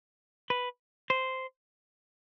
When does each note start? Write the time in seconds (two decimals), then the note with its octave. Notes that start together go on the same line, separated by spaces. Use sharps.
0.50 B4
1.10 C5